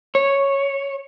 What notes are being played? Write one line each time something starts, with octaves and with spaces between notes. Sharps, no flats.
C#5